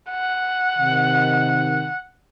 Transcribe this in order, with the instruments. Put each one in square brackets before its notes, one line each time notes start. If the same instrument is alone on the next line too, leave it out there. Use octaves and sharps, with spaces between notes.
[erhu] F#5
[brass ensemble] C3 D#3